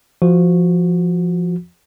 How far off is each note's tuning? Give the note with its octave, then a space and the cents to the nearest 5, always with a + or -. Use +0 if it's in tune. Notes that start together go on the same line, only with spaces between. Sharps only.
F3 -10 F#4 -10